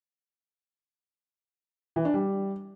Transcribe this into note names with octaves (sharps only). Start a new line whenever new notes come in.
E3
D4
G3